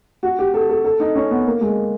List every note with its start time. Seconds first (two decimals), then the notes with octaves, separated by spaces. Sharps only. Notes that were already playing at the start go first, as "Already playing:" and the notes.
0.23 F#4
0.39 G4
0.54 A4
0.69 A4
0.85 A4
1.00 D#4
1.15 C#4
1.31 B3
1.46 A#3
1.61 G#3